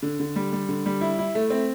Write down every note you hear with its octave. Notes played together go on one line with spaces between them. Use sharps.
D3
D3
G3
G3
D3
G3
E4
E4
A3
C4